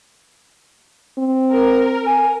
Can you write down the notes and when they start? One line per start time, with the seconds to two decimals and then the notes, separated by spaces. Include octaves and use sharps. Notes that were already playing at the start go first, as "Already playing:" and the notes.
1.18 C4
1.52 A#4
2.07 G#5